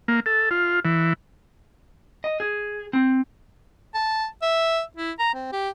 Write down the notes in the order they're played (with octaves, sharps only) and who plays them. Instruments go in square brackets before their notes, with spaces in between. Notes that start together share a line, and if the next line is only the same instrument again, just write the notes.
[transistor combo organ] A#3
A4
F4
E3
[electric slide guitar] D#5
G#4
C4
[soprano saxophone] A5
E5
E4
A#5
C4
G4